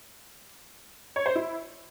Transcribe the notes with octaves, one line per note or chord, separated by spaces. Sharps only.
C#5
C5
E4